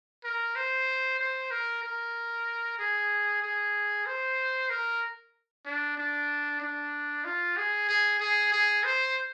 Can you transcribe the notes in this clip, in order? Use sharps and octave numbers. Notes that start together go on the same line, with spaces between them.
A#4
C5
C5
A#4
A#4
G#4
G#4
C5
A#4
D4
D4
D4
F4
G#4
G#4
G#4
G#4
C5